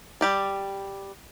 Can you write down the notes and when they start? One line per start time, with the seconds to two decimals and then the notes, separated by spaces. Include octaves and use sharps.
0.21 G3 G4 D5